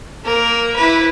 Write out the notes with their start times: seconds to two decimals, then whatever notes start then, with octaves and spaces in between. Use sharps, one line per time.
0.25 A#3 A#4
0.76 E4 B4